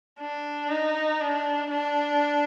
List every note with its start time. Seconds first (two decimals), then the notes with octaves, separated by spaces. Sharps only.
0.20 D4
0.70 D#4
1.21 D4
1.70 D4